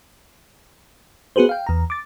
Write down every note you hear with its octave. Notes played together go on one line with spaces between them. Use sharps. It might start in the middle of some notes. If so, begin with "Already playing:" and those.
B3 F#4 G#4 B4 C5
F5 G5
E2 A#5
D6 A6